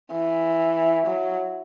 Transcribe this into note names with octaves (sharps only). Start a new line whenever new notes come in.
E3
F#3